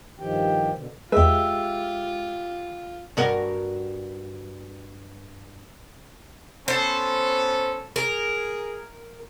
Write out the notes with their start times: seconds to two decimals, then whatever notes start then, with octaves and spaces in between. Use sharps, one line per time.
0.20 G2 D#3 F3 G4 G5
0.73 B2 D3
1.12 E2 G#3 F4 G4 B4 E5
3.17 G2 F#4 A#4
6.68 B3 C#4 A4 C5
7.96 G#4 A#4 A#5